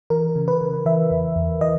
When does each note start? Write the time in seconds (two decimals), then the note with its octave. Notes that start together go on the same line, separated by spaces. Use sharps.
0.10 E3 A#4
0.36 C#3
0.48 B4
0.61 C#3
0.86 E3 E5
1.11 E2
1.36 E2
1.61 E3 D#5